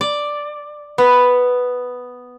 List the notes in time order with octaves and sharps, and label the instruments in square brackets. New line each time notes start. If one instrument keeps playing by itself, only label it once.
[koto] D5
B3